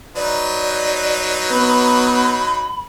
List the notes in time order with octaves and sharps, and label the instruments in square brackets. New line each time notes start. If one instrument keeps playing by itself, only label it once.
[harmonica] F#3 D#4 B4 [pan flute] D5
[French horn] B3 [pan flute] B5